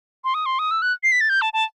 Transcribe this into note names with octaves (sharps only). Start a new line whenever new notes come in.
C6
D#6
C6
D#6
E6
F#6
C7
B6
A6
G6
A5
A5